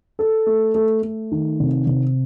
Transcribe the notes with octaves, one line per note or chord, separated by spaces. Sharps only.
A4
A3
A3
A3
D#3
C3
C3